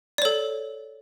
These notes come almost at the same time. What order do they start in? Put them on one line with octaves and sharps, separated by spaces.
D5 C#5 A4